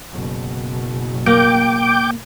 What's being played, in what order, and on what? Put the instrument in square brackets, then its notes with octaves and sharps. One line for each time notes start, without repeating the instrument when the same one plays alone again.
[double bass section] F#1 B2
[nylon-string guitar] A#3 [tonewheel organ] G5 D6